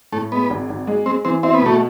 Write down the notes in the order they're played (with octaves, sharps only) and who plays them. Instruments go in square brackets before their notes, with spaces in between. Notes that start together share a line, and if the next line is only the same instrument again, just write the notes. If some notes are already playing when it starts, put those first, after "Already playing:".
[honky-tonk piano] A2 [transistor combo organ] A3
[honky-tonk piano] G#3 [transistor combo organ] B3
[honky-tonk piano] G#1
G#1
G#3
[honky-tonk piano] G#3 [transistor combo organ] C4
[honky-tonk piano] E3 [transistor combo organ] C4
[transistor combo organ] C4 [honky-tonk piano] E4
[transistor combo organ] B3
[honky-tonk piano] B2 [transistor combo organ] A3